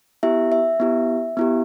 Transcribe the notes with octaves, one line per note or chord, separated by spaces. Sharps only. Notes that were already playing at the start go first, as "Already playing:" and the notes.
B3 E4 G4 E5
E5
B3 E4 G4
B3 E4 G4